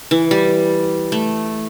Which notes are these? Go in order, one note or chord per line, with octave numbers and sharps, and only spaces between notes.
E3
G3
A3